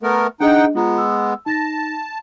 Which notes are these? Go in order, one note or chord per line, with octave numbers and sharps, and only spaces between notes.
A3 B3 A#4
D4 D#4 G#4 D#5 F#5 G5
G#3 B3 F4 A#5
E6
D#4 A5 A6 A#6